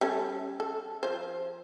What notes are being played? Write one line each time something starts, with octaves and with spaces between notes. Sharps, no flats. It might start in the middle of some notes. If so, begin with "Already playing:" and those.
G3 C#4 A4
A4
F3 C5